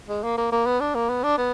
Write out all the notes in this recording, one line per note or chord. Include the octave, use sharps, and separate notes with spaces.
G#3
A#3
A#3
A#3
B3
D4
A#3
B3
D4
B3